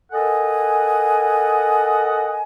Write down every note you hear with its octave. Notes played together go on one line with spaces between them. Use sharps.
A4 A#4 D#5 F#5 G#5